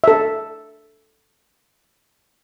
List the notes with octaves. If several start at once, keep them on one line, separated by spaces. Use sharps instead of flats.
A4 E5